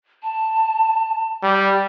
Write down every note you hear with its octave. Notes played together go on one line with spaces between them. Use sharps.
A5
G3